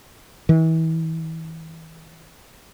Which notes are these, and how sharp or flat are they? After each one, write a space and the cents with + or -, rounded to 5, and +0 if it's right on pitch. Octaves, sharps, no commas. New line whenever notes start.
E3 -35